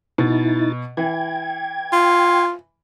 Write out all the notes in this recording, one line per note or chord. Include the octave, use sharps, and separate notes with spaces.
B2 D#4 E4 A6
E3 G5 G#6
F4